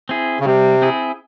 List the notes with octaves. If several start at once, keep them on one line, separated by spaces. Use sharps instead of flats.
C4 E4 G#4
C#3
C3 G3
C4 E4 G#4